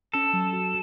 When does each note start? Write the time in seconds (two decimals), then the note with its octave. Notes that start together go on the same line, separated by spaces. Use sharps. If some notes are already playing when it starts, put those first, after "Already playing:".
0.14 C#4 A4
0.33 F#3
0.53 F#4